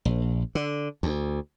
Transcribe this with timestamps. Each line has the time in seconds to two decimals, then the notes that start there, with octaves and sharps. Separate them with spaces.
0.05 A#1
0.55 D3
1.03 D2